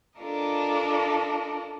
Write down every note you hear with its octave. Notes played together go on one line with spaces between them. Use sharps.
D4 F4 A4 A#4 D#5